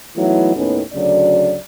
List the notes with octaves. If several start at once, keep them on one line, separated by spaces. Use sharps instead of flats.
E3 F#3 A3 B3 D#4 E4
D#2 A2 D#3 B3 C#4
D2 C#3 F#3 D5